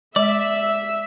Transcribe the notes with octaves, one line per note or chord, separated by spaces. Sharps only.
G#3 D5 E5